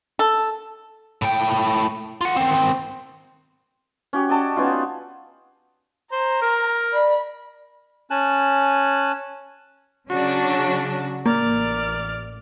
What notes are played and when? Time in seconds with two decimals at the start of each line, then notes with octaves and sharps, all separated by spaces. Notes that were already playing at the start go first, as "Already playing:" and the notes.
0.19 A4
1.22 A2 G5
2.21 F4 F#5
2.36 D#3 C4
4.13 C#4 F#4 G4
4.29 D5 D#5 A5
4.56 B3 C#4 D#4 F4
6.12 C5 A#5
6.42 A#4
6.93 D5 B5
8.11 C#4 G#5 A5 F#6
10.09 C#3 F#3 D4 F#4
11.26 A1 A#3 D5 F6